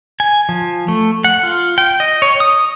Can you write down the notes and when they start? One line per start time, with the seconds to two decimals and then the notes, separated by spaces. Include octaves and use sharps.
0.20 G#5
0.49 F3
0.88 A3
1.24 F#5
1.43 F4
1.78 G5
2.00 D#5
2.22 C#5
2.40 D#6